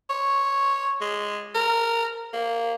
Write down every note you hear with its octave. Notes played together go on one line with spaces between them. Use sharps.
C#5
G#3
A#4
A#3